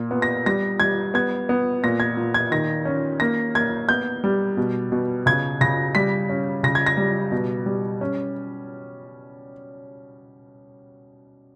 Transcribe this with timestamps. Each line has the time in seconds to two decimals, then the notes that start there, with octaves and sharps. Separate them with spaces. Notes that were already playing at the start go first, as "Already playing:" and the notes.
Already playing: A#2
0.11 B3
0.22 A#6
0.46 G3 A#6
0.80 G3 G#6
1.14 B3 G#6
1.49 B3
1.84 A#2 A#6
2.00 G#6
2.17 A#2
2.34 G#6
2.51 D#3 A#6
2.85 C#4
3.20 A#3 A#6
3.55 A#3 G#6
3.89 B3 G6
4.24 G3
4.57 B2
4.92 B2
5.26 C#3 G#6
5.61 C#3 A#6
5.95 G3 B6
6.29 C#4
6.63 C#3 A#6
6.75 G#6
6.86 A#6
6.97 G3
7.32 B2
7.66 G3
8.01 C#4